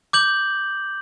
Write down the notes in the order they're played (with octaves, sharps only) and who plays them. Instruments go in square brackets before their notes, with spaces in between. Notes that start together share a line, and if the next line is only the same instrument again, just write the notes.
[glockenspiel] D6 G6 F#7